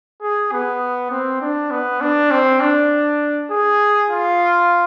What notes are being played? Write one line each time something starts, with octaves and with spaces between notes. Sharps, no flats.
G#4
B3
C4
D4
B3
D4
C4
D4
G#4
F4